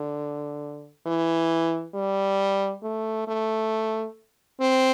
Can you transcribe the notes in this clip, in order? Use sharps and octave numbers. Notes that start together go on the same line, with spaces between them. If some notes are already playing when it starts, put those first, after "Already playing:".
Already playing: D3
E3
G3
A3
A3
C4